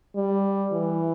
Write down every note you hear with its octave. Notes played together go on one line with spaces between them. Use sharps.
G3
E3